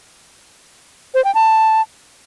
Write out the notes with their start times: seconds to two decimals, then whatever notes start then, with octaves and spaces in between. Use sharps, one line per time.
1.14 C5
1.25 G5
1.35 A5